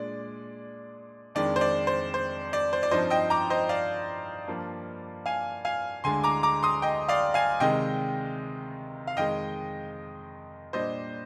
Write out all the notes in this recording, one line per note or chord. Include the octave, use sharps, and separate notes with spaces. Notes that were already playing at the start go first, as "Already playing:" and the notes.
Already playing: A#2 G#3 D4 D5
F2 D#3 G#3 D4 D5
C5
D5
C5
C5
D5
C5
D5
G2 F3 C4 D#4 C5 D#5
D#5 G5
A#5 D6
C5 D#5
D5 F5
G2 F3 A#3
F5 G#5
F5 G#5
D2 D3 G#3 D4 G#5 C6
A#5 D6
A#5 D6
C6 D#6
D#5 G5
D5 F5
F5 G#5
C3 D#3 G#3 D#5 G5
F5
F2 D#3 G#3 D#5 G5
A#2 G3 D4 C5 D#5